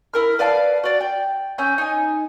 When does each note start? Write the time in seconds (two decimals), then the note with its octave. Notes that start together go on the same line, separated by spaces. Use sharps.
0.14 E4 A#4 F6
0.39 B4 D5 F5 A5
0.84 F#4 D5
1.01 G5
1.58 C#4 E6 G6
1.78 D#4 G#5